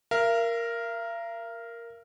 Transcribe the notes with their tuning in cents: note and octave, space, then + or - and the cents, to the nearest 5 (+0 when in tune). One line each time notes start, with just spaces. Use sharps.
A#4 +0 F5 -45